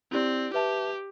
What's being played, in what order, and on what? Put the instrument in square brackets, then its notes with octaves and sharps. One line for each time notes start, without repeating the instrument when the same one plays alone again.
[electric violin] C4 [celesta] E4 G4 D5
[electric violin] G4 [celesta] B4 E5 A5